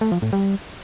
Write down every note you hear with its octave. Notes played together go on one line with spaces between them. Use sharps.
A3
F3
A2
G3